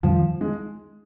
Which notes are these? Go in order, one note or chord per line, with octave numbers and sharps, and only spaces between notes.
F2 D#3 F3 G3
G#3